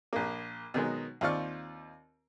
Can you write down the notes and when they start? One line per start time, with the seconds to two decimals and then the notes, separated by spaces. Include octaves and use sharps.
0.13 A#1 A#3
0.74 B2 D#3 F#3 G#3
1.21 D#2 C4 F4 D5 C#6 F6